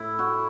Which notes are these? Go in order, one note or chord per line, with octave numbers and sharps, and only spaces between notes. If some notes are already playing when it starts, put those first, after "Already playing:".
Already playing: A2 E4
F#4